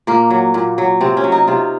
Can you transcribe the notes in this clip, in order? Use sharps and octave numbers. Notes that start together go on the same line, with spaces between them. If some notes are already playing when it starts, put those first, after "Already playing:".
A#2 A#3
F#3
A#2
F#3
C3 C4
C#4
F#3
D#4
C3 F4